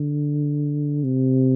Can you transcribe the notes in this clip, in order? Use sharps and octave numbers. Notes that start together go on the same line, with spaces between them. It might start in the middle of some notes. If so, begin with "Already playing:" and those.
Already playing: D3
C3